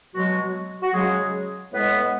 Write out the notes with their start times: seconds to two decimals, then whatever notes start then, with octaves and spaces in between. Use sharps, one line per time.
0.14 B2 F#3 G#3 F#4
0.82 F#4
0.93 C#3 F#3 G#3 G#4
1.72 A2 G#3 B3 B4